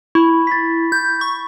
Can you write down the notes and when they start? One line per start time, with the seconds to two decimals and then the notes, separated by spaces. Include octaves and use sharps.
0.15 E4 B5 C#6
0.47 A6 B6
0.92 G6
1.21 C#6